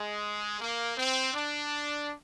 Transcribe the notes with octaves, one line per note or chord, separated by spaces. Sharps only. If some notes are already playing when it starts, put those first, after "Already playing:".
Already playing: G#3
A#3
C4
D4